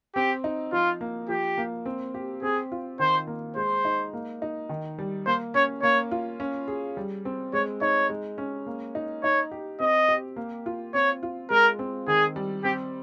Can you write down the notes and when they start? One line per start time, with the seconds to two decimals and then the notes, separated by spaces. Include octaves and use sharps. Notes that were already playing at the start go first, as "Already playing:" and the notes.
0.15 C4 G4
0.44 D#4
0.72 F3 F4
1.01 A#3
1.29 F3 G4
1.58 A#3
1.86 C4
2.15 G4
2.42 C4 G#4
2.72 F4
2.99 D#3 C5
3.27 A#3
3.56 G#3 C5
3.85 D#4
4.13 A#3
4.42 D#4
4.69 D#3
4.99 G3
5.26 A#3 C5
5.54 C#4 C#5
5.83 A#3 C#5
6.11 F4
6.40 C#4
6.68 G#4
6.97 G3
7.25 C4
7.53 G#3 C#5
7.81 D#4 C#5
8.10 G#3
8.38 C#4
8.67 A#3
8.95 D#4
9.23 D#4 C#5
9.52 G4
9.80 C4 D#5
10.08 G4
10.36 A#3
10.66 F4
10.94 C4 C#5
11.23 F4
11.50 G#3 A#4
11.79 C4
12.07 D#3 G#4
12.36 G3
12.64 C4 G4